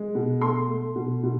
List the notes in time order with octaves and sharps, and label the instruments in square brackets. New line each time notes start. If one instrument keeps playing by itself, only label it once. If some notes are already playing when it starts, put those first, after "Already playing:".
Already playing: [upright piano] G#3
B2
A3 C6
A3
B2
B2